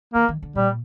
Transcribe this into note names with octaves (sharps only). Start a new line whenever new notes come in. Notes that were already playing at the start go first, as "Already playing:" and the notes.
D#3 A#3
D#3
D3
A#2 G3